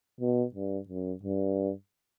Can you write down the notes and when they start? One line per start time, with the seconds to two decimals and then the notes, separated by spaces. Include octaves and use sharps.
0.20 B2
0.54 G2
0.89 F#2
1.23 G2